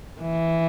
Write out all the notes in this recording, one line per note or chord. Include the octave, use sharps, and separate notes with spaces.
E3